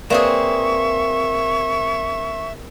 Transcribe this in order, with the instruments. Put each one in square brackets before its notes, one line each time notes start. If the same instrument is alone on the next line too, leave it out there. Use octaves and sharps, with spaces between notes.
[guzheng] A#3 C4 G#4 [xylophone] B4 D5 E7 [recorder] E5 [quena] C#6